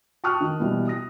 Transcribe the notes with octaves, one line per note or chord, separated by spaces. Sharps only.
G5 A5 C#6 D#6 F6 F#6
D#3
B2 E3 G3
D#6 A#6